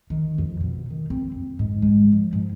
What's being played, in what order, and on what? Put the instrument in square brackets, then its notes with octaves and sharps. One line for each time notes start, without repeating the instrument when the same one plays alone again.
[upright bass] D#3
F2
B2
D#3
C4
F2
G#2
G#3
F3
G#2